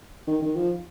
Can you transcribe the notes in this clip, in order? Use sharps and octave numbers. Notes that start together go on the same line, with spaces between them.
D#3
D#3
F3